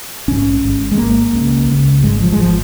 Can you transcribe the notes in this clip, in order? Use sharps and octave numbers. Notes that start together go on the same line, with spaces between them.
A#1 G#2 C#4
G#1 G#2
G#3
G#1 G#2 A#3
C#2 C#3
C#2 C#3
G#1 G#2 G#3
F3
G#3
G#1 F3